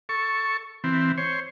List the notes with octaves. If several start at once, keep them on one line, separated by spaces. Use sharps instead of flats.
A4 C#6
E3 C4
C5 C#5